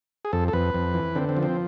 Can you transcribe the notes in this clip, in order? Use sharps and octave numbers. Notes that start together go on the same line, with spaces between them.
G#4
F2 A4
A4
F2 B4
F2
E3
D3 C4
C4
F3
C4